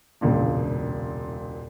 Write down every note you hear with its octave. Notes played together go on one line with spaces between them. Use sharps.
E1 C#2 A#2 D4